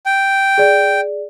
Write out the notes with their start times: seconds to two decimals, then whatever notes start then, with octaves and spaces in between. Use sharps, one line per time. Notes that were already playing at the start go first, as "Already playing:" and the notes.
0.06 G5
0.58 G#4 D5